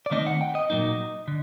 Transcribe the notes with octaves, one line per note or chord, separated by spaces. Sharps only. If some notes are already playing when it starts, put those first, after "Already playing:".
D5
D#3 A3 C4 D#4 D#5
F#5
G5
D#5
A#2 F#3 A#3 D#4
D3